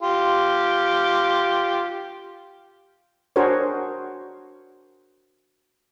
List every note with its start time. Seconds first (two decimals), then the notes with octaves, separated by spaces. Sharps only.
0.02 F4 G4
3.36 D4 F#4 G#4 A#4 C5 C#5